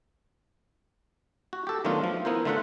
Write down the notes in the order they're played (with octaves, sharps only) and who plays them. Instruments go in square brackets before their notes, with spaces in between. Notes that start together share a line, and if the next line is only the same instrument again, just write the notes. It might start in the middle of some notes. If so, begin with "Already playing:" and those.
[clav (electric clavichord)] F#4
G4 A4
D#3 F#3 A3 B3 D4 F4
F3
B3 E4 A#4 C5
D3 A3 F4 E5 F#5